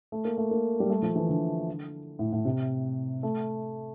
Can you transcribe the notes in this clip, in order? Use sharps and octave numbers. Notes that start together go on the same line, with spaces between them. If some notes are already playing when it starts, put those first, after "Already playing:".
A3
A#3
A3
A#3
G3
A3
F3
E3
D3
A2
A2
C3
A3